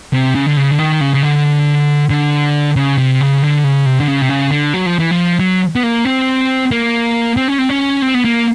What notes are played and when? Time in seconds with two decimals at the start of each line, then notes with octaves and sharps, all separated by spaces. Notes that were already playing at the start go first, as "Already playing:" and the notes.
0.13 C3
0.35 C#3
0.46 D3
0.57 C#3
0.71 D3
0.79 D#3
1.01 C#3
1.14 C#3
1.23 D3
2.10 D3
2.76 C#3
2.98 C3
3.21 C#3
3.42 D3
3.64 C#3
3.86 C3
4.00 D3
4.08 C#3
4.22 C3
4.29 C#3
4.51 D3
4.74 F#3
4.86 F3
4.99 E3
5.11 F3
5.39 F#3
5.76 B3
5.83 A#3
6.05 C4
6.71 A#3
7.37 C4
7.48 C#4
7.58 C4
7.69 C#4
8.02 C4
8.14 B3
8.25 A#3